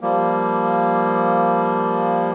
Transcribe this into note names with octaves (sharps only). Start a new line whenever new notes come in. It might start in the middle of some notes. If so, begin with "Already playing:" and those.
F3 G3 A#3